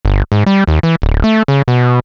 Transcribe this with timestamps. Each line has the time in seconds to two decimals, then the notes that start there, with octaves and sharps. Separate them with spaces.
0.05 G1
0.32 G#2
0.46 G3
0.68 D#2
0.83 E3
1.02 D1
1.24 A3
1.48 C#3
1.68 B2